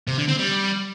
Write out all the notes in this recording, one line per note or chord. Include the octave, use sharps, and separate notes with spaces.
C3
D3
C4
G3